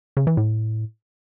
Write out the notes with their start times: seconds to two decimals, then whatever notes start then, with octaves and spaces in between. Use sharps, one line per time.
0.17 C#3
0.27 E3
0.37 A2